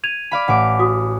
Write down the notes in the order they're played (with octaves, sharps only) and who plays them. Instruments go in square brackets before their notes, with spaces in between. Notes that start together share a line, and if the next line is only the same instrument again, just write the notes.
[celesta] G#6 D#7 F7
[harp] D5 F5 B5
[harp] A1 D6 [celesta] F#5
[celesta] F#4 D#6